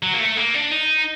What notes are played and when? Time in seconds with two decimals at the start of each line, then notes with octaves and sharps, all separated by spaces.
0.03 F#3
0.14 A#3
0.20 A3
0.37 A#3
0.54 D4
0.71 D#4